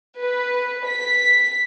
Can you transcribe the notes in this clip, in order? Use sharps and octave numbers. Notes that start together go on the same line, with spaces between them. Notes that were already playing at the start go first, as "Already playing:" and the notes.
B4
B6